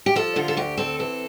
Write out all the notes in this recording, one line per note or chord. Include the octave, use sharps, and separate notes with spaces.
G4
F3 A4
D3 F4
A4
D2 G4
C4 A4
E3 A4